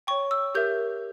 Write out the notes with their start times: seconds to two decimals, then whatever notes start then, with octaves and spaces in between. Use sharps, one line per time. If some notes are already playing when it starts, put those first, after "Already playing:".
0.07 C#5 G5 C#6
0.31 E6
0.55 G4 A#4 E5 G6